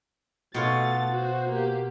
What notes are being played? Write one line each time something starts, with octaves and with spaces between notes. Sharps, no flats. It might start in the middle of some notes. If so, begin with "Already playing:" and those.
B2 A3 F4 C#5 A6
F#4 C5
A#3 G4